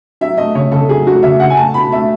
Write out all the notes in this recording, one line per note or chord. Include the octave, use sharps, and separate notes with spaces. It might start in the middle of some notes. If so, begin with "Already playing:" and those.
F#3 E5
A3 D#5
C#3 C#5
C#3 A4
F#3 G#4
A3 F#4
C#3 E5
C#3 F#5
G#5
A3 A5
B2 B5
A3 E5